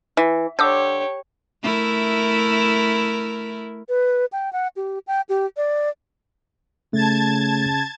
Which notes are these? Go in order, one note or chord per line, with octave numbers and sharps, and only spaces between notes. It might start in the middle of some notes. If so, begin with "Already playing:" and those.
E3
D3 G4 C#5 D6 E6 G6
A3 E4 A#4
B4
G5
F#5
G4
G5
G4
D5
C#3 A3 A5 G#6 A6